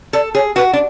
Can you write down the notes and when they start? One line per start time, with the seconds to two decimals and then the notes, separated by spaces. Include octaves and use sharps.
0.13 A4 D5
0.35 G#4 C#5
0.56 F#4 B4
0.73 D4